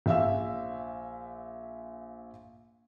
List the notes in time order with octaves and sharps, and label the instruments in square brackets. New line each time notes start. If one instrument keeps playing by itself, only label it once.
[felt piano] A#1 E5 F5 E6